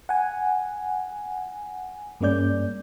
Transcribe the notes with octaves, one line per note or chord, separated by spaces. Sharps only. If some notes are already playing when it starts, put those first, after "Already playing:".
F#5 G#5
G2 G#3 A#3 C#4 D5 G6